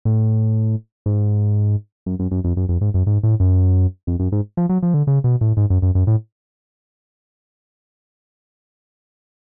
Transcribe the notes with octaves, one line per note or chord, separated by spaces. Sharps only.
A2
G#2
F#2
F#2
F#2
F2
F#2
F2
G#2
F#2
G#2
A2
F#2
F2
F#2
G#2
F3
F#3
F3
D3
C#3
B2
A2
G#2
F#2
F#2
F#2
A2